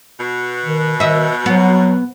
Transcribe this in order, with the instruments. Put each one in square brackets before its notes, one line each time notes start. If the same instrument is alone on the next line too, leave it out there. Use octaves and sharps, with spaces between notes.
[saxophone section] B2
[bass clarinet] D#3
[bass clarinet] D#3 [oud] D#5 E5
[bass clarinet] F#3 [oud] B3